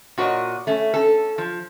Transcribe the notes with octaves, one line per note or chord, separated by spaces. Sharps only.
A#2 F#4 A#4 C#5 D#5
A3 C#4
C#4 A4
F3